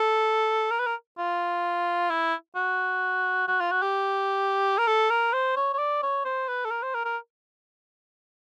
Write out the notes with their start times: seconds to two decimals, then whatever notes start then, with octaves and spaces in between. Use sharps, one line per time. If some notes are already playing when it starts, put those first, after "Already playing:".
Already playing: A4
0.71 A#4
0.79 B4
0.87 A#4
1.18 F4
2.10 E4
2.56 F#4
3.48 F#4
3.60 F4
3.71 F#4
3.82 G4
4.78 A#4
4.87 A4
5.10 A#4
5.33 C5
5.56 C#5
5.73 C#5
5.78 D5
6.03 C#5
6.25 C5
6.48 B4
6.65 A4
6.71 A#4
6.83 C5
6.94 A#4
7.05 A#4